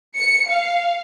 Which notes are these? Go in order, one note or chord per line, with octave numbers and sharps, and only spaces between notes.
C#7
F5